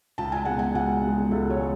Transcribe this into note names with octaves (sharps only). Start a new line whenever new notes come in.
C#2 A5
G#5
B2 G#3 F#5
G#5
C#2 F#5
B2 G#3
C#2 A4
C#5
G#3